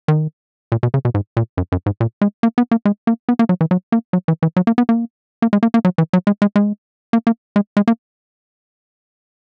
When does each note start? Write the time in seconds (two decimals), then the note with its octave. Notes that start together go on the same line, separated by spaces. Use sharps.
0.08 D#3
0.72 A#2
0.83 B2
0.94 C#3
1.05 B2
1.14 G#2
1.37 A#2
1.57 F#2
1.72 F#2
1.86 G#2
2.00 A#2
2.21 G#3
2.43 A#3
2.58 B3
2.71 A#3
2.85 G#3
3.07 A#3
3.29 B3
3.39 A#3
3.49 F#3
3.61 E3
3.71 F#3
3.92 A#3
4.13 F#3
4.28 E3
4.43 E3
4.56 F#3
4.67 A#3
4.78 B3
4.89 A#3
5.42 A#3
5.53 G#3
5.63 A#3
5.74 A#3
5.85 F#3
5.98 E3
6.13 F#3
6.27 G#3
6.42 G#3
6.56 G#3
7.13 A#3
7.27 A#3
7.56 G#3
7.77 G#3
7.88 A#3